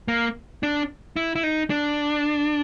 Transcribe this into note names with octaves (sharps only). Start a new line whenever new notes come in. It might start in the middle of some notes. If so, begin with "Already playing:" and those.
A#3
D4
E4
E4
D#4
D4